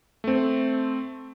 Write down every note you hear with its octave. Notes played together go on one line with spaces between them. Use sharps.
A3 C4